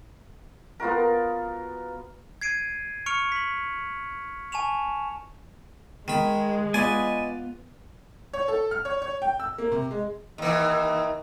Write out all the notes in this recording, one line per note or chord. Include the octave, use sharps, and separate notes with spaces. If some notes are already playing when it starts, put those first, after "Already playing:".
B3 F4 F#4 A#4
G#6 C7 D7 D#7
C#6 F6 C#7 D7 F7
B6 F#7
G#5 A5 C#6 E7 F7
D#3 G#3 B5
B3 F4 B4 D5 D#5 G#5
C#5
A4
F6
C#5
C#5
G5
E6
A#3
C3
G#3
D#2 D#3 E3